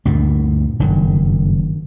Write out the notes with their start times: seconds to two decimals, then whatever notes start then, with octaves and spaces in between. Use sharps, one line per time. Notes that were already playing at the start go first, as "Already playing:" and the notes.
0.05 D2 G2 A#2
0.80 F#1 G2 D#3